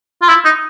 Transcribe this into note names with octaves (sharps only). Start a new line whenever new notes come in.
F4
E4
D#4